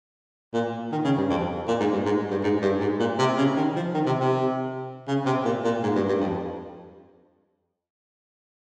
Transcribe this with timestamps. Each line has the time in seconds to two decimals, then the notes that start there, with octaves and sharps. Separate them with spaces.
0.53 A#2
0.92 D#3
1.04 C#3
1.17 G2
1.30 F2
1.68 A#2
1.80 G#2
1.92 G2
2.05 G#2
2.31 G2
2.43 G#2
2.62 G2
2.81 G#2
2.99 A#2
3.19 C3
3.37 C#3
3.56 D#3
3.76 F3
3.94 D#3
4.06 C3
4.19 C3
5.07 C#3
5.26 C3
5.45 A#2
5.64 A#2
5.83 G#2
5.95 G2
6.08 G2
6.21 F2